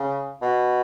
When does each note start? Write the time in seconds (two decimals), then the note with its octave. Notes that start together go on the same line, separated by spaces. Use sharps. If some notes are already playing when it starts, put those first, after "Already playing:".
Already playing: C#3
0.42 B2